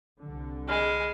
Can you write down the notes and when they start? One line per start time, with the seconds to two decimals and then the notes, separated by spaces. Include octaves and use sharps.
0.20 C2 D3
0.69 G#3 B5 F6